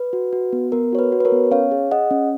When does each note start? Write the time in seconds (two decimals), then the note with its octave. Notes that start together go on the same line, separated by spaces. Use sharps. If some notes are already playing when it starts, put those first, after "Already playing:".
Already playing: B4
0.13 F#4
0.33 F#4
0.53 B3
0.72 B3 A#4
0.92 F#4 C#5
0.99 B4
1.12 F#4
1.20 B4
1.25 A#4 C#5
1.32 B3
1.51 C#4 C#5 F5
1.71 G#4
1.91 G#4 D#5 F#5
2.11 C#4